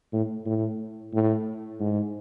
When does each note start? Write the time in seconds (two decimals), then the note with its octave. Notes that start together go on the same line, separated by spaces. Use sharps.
0.13 A2
0.46 A2
1.13 A2
1.80 G#2